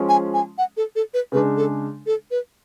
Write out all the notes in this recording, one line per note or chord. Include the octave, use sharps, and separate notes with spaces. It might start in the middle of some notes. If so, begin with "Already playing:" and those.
Already playing: F3 G#3 C#4 G#4
G#5
G#5
F#5
A4
A4
B4
C#3 G#3 D4 B4
A4
A4
B4